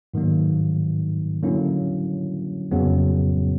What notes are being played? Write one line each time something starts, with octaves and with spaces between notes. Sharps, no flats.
G#2 D#3 F#3 A#3
D3 F#3 A#3 C#4 E4
F2 C#3 F#3 B3